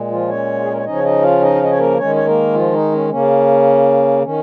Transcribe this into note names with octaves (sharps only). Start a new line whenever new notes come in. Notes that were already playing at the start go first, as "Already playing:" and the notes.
Already playing: A#2 G#3
F3 F4
C#4 C#5
F4
G#4
A#4
C#5
C#3 F3 C#4 D#4 D#5
C#5
D#4 D#5
F4 F5
D#4 D#5
F5
D#5
C#5
A#3 A#4
D#3 G#3 C#4 C#5
C#5
A#3 A#4
F3 F4
D#4
C#4
C#3 A#3 C#4
D#3 C#4